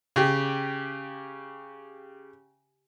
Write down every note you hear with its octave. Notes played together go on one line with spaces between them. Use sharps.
C#3 G4